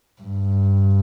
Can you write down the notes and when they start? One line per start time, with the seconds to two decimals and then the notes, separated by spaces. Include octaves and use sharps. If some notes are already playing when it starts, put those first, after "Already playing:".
0.22 G2